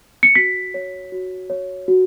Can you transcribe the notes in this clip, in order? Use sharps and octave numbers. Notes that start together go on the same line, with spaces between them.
C#7
F#4 B6
C#5
F#4
C#5
F#4